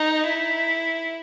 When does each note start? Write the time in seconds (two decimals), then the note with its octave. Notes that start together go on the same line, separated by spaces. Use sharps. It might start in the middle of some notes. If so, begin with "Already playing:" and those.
Already playing: D#4
0.28 E4